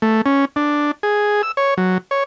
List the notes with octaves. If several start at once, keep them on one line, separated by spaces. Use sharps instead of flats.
A3
C#4
D4
G#4
E6
C#5
F#3
C#5